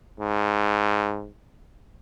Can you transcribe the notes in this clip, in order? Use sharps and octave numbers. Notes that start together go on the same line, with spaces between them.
G#2